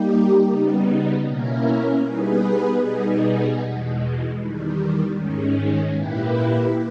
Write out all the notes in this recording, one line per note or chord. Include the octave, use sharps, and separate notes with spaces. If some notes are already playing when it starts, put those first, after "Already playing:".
Already playing: G3 A#3 D#4 G4
C#3 G3 B3 D#4
B2 A#3 C#4 E4 A#4
G3 B3 D#4 G#4 B4
B2 G3 B3 D#4 G#4
E2 B2 G#3
E2 D#3 G3
G#2 D#3 G#3 C#4
A#2 A#3 E4 G4 B4